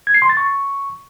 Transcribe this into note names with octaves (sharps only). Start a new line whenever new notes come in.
G#6
C7
C6
A6
C#6